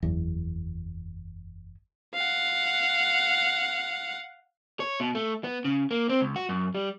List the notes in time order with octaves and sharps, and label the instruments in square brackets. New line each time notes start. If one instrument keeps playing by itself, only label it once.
[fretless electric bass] F#1 E2
[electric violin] F5 F#5
[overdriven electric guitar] C#5
B2
A3
B3
C#3
A#3
C4
C#2
F#4
F#2
G3